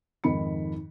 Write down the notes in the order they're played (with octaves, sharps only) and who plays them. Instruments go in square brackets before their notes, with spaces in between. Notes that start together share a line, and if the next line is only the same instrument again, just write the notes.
[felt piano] F2 G#2 D#3 B5 C#7